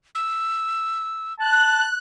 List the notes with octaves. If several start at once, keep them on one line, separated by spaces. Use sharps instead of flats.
E6
A5 F#6